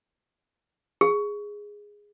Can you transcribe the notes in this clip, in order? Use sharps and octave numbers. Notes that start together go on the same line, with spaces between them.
G#4